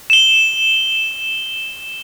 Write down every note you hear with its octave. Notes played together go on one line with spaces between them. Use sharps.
E7 G7